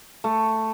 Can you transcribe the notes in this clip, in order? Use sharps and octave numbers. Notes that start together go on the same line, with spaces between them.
A3